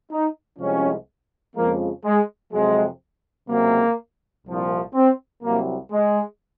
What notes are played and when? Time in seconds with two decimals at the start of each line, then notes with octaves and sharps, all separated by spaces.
0.11 D#4
0.59 C2 C3 F3 G#3 C#4
1.56 F2 C#3 F3 G#3 A#3
2.04 G#3
2.53 F2 C3 F#3 G#3
3.49 C#2 C3 F#3 A#3
4.46 C2 A#2 F3
4.94 C4
5.43 C2 C3 F#3 A#3
5.91 G#3